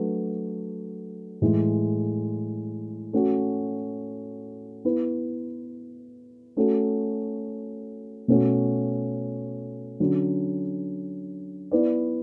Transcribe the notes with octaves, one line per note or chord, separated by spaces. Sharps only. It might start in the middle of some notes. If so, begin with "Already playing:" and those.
Already playing: F#3 A3 D4 F#4 B4
A2 E3 G#3
A3 C#4 F#4
B3 E4 B4
A3 C#4 F#4 A4
B2 A3 C#4 F#4
D3 F#3 C#4
B3 E4 B4 D5